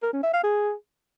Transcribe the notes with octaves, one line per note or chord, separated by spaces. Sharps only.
A#4
C#4
E5
F5
G#4